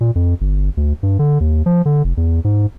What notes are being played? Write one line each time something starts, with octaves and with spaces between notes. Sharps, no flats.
A#2
F2
G1
D2
G2
D3
D#2
F3
D3
F1
E2
G#2